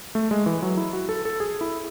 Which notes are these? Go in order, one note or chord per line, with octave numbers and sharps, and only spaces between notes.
A3
G#3
E3
F#3
E4
F#4
A4
A4
G#4
E4